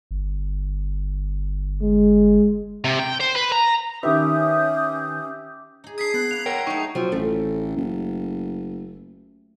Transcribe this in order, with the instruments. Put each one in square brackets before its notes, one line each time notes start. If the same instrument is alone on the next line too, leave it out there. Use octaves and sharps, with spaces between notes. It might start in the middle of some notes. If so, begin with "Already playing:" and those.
[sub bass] G1
[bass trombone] G#3
[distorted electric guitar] C3
G5
C5
B4
A#5
[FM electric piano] D#3 B4 [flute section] C#4 D#6 G6 [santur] G4 E5
[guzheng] D#4 G#4
[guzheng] D4 G#5 [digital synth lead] D#6 [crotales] G#6 B6 C7
[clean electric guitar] B3 [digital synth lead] F#6
[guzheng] A#3 [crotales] F7
[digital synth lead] A#4 [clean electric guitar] C#5 F#5 G5
[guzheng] F#3 A3 [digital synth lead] D#4 [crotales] C#6
[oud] F3 C4 [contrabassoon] F#3
[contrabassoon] A1 [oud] A3
[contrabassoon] F#1